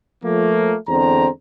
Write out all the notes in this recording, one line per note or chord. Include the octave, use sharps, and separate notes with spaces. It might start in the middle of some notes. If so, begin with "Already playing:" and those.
F3 A3 A#3
E2 D3 G#3 C4 A#5